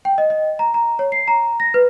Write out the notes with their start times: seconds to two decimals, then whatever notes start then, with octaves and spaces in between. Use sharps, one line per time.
0.05 G5
0.18 D#5
0.30 D#5
0.59 A#5
0.74 A#5
0.99 C#5
1.12 C7
1.28 A#5
1.60 A#6
1.74 B4